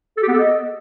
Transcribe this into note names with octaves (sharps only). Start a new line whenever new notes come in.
A4
G4
B3
A4
D#5